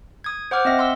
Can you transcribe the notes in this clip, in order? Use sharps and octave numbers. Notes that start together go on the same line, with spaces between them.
D#6 G#6
C5 F#5 D6 F6
C4 D#5 E5 A#6
C6 E6